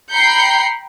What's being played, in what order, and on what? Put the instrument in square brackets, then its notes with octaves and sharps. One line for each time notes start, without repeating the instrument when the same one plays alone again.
[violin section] G5 A#5 B5 G6 C7 C#7